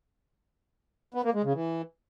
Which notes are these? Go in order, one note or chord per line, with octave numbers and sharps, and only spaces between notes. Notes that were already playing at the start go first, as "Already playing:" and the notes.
B3
A#3
G#3
C#3
E3